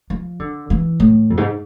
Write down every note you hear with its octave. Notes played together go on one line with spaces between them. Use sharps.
F3
D3
E3
A2
F2
G#2